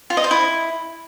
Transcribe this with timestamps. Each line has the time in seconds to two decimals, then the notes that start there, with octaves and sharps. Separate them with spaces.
0.10 F4
0.17 D#5
0.24 C5
0.31 E4